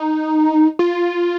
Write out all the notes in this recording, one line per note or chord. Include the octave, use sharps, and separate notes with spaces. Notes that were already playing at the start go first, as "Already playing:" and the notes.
Already playing: D#4
F4